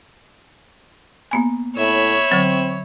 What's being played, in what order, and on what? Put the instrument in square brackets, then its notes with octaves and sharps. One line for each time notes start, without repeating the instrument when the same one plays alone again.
[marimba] A#3 B3 G#5
[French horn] A2 [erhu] C#5 [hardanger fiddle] E5 B5
[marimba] D3 F#3 [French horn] C4